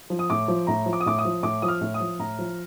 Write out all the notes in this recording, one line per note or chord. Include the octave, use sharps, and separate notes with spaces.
F3
D#6
A2 D6
F3
A2 A#5
F3
D6
D#6
A2 D6
D#6
F3
A2 D6
F3 D#6
F6
A2
D#6
F3
A2 A#5
F3